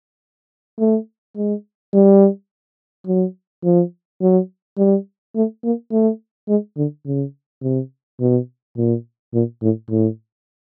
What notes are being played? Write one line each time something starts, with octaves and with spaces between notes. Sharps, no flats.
A3
G#3
G3
F#3
F3
F#3
G3
A3
A#3
A3
G#3
D3
C#3
C3
B2
A#2
A#2
A2
A2